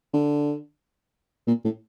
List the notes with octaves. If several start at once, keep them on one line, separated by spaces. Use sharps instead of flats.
D3
A#2
A2